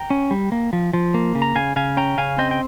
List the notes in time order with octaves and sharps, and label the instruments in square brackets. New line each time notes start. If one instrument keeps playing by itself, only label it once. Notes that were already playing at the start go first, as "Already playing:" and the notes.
Already playing: [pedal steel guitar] G5 A#5
C#4
G3
A#3
F3
F3
A#3
C#3
A#5
C#3 F5 G#5
C#3 F5 G#5
C#4 G5 A#5
C#3 F5 G#5
C4 D#5 G5
G5